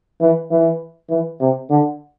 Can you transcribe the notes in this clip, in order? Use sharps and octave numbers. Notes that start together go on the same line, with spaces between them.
E3
E3
E3
C3
D3